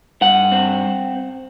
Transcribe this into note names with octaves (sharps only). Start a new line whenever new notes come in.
G2 F#5
C4